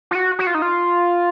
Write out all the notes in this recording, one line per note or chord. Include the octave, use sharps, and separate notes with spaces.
F4
F#4
F#4
F4
D#4
F4